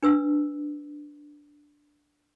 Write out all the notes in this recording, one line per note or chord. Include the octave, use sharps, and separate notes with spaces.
D4 B4 E6